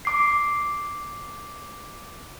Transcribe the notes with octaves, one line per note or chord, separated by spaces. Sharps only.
D6 C7